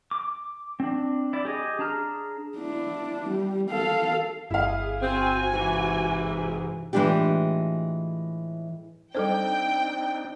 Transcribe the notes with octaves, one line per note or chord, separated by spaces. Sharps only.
D6
C4 D4
E4 D5
G4 G#4 D#5
D4 G#4 A5 A#5 F6
D4 E4
G3
A4 F5
G1 E4 G#4 F5
C4 F#4 G#5
G#2 C3 E3
A2 E3 G#3 D4 F4 G4
G3 C4 D4 D#4 A4 C5 G5